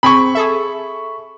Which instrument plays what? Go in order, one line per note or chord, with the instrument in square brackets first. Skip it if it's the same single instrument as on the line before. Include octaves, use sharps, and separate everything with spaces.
[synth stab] C4 G#4 [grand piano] B5 C#6
[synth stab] G#4 A4 E5